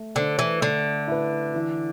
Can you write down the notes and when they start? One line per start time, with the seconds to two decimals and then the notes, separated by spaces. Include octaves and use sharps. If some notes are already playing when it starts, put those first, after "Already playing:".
Already playing: A3
0.15 D3 D4 A4 C5
0.39 E3
0.62 D3 A3
1.07 E4 B4
1.54 E3